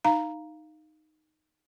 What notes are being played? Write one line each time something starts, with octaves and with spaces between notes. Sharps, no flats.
D#4 F5 A#5